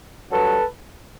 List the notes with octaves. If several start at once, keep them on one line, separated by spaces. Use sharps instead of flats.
G2 D3 F#3 A4 B4